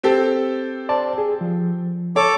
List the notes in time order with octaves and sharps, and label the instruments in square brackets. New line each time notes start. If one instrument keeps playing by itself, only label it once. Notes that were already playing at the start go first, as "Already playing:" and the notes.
[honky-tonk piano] C4 G4 A4
[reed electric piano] C5 D5 A5
G#4
F3
[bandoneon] A4 D6 [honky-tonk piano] C#5